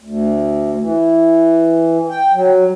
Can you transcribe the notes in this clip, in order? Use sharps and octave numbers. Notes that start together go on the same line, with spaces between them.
D2
E3
G5
F#3